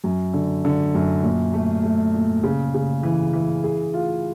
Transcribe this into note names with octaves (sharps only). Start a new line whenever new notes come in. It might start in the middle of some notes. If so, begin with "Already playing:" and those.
F#2
D3
D3
F#2
A#2
A3
A3
A#2
C#3
C#3
E3
E3
G#4
F4